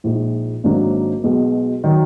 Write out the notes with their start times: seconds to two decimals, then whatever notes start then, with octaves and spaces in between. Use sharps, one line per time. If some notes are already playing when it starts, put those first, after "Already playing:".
0.04 A#1 A#2 G#3 D#4
0.64 G#1 G#2 F#3 A#3 D4
1.24 B1 B2 G#3
1.84 D#3 F#3